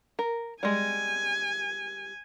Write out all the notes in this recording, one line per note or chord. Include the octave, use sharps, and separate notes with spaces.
A#4
G3 G#3 G#5